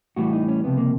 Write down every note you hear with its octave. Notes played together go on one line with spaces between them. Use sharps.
A2 E3 G3 F#4
D#4
C#4
C#2 C3 F3 B3
A#3